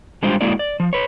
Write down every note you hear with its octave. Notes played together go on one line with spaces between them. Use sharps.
G3 G#3 D4 F4 G4 C5
G#3 A#3 E4 F#4 A4 D5
D5
F3
B4 C#5